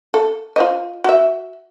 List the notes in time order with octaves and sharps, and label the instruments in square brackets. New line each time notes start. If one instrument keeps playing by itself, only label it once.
[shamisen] A4
F4 C5 D#5
F#4 E5